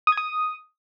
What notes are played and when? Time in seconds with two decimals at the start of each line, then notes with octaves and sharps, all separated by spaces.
0.07 D#6
0.12 G#6
0.17 D#6